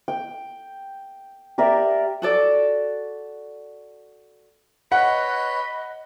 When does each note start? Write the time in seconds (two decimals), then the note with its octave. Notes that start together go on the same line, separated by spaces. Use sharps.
0.08 G5
1.58 G4 A#4 D5 E5
2.22 F#4 A4 D5
4.92 B4 C#5 D#5 F#5 B5